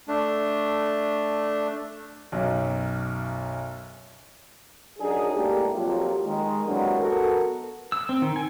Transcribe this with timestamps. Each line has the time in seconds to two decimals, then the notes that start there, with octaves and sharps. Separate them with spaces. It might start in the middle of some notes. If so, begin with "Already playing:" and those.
0.08 A3 D4
2.32 B1 F#2
4.99 F#2 D4 D#4 G#4
5.33 A2 G#3 A#3 D4 G4
5.74 F2 F#3 A#3 F4 G4
6.24 D#3 G#3
6.65 C3 E3 F#3 G#3 A#3 D4
6.98 B3 F#4 A4 A#4
7.92 E6
8.09 C4
8.22 D#3
8.36 G#5